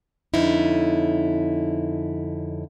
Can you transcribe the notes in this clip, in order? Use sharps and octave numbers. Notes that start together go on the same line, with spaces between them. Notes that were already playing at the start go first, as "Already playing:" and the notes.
F2 D3 C#4 D#4 E4